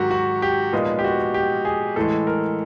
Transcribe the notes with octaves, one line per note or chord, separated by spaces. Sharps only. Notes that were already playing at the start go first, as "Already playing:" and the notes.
Already playing: G#2 D#3 F#3 F#4 G4
F#4
G4
A#2 F3 G#3 B3 D#4
G4
F#4
G4
G#4
A2 E3 G#3 A4
A#4